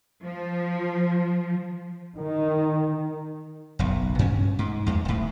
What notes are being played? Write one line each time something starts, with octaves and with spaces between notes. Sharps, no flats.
F3
D#3
F#1 B1
G2 C#4
G#2
E2 G#2
D#1 A2